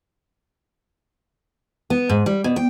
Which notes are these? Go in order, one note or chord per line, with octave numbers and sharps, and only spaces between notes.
B3
G#2
G3
B2
G5